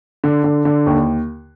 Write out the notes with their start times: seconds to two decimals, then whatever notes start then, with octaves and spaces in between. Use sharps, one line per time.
0.24 D3
0.44 D3
0.65 D3
0.86 D#2